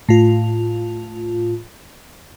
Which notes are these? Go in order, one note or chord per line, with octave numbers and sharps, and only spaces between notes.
A2 F4